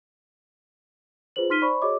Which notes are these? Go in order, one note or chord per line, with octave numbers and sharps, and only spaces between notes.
F4 G#4 B4 C5 F#7
D#4 C6 F6 B6 D#7 G7
C5 D5 B5 C#6
F#4 G#4 C#5 D#5 D6